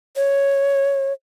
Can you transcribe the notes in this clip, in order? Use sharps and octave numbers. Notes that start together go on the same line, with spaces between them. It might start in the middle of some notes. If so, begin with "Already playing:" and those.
C#5